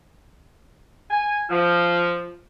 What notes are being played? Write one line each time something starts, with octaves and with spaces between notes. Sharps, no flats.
G#5
F3